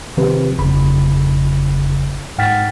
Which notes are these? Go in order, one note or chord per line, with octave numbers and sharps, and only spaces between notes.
C3 D#3 F3 C4 G4 B4
G1 F2 C#3 B5
G#2 F#5 G5 F6 A6 B6